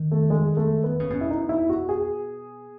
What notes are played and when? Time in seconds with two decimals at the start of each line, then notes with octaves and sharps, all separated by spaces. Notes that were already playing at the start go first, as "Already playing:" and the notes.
Already playing: D#3
0.11 A3
0.30 G#3
0.57 A3
0.84 B3
1.00 C#3
1.10 B2 C#4
1.21 E4
1.30 D#4
1.49 E4
1.69 F#4
1.89 G#4